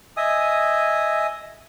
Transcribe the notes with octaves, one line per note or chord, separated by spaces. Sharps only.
D#5 E5 G#5 D#6